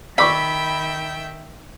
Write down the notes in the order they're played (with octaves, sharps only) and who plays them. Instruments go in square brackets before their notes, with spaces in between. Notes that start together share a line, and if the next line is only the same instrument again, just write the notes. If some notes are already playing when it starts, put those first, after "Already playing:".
[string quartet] D#3 E5 G5 [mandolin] B5 [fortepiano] C#6 D6 E6